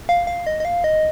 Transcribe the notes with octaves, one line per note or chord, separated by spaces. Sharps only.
F5
F5
D#5
D#5
F5
D#5